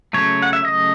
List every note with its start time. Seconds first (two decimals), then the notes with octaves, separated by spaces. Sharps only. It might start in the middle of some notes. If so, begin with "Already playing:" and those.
0.13 C#3 F#3 A3 C#5
0.42 F#5
0.53 E5
0.65 D#5